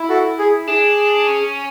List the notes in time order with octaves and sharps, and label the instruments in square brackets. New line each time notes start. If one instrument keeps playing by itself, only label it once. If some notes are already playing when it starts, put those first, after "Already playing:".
Already playing: [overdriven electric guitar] E4
[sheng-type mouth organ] F#4 A4
G#4
[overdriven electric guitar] D4 [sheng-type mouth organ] G#4
[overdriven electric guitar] C#4